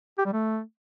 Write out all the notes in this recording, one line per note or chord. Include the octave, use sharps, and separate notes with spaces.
G4
G3
A3